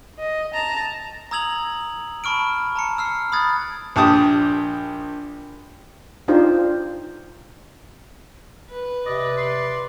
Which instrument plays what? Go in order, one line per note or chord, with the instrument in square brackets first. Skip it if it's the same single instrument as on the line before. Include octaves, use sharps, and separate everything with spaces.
[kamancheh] D#5
A5 A#5
[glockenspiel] A#5 D#6 E6 G#6 F7 F#7
A5 B5 C#6 F6 D7
A5 A#5 C#7
E6 F6 C7
B5 D#6 F#6 G#6 A6
[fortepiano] A#1 G4 A5 D6 D#6
[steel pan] D4 D#4 F4 G4 C5
[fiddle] B4
[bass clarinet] C3 [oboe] D5 [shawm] D#5
[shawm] C6